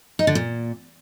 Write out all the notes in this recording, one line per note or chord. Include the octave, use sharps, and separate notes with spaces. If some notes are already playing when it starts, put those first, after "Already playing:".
D#4
D3
A#2